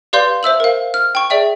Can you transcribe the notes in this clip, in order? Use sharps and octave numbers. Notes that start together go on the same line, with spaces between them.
G4 B4 D5 F5 C6 G6
C5 E5 E6 F#7
A#4 F5
F6
G5 C#6
G#4 D5 E5 G5